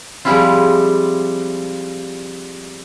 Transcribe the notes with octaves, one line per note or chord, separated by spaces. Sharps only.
F3 G3 G#3 C4 E4 F4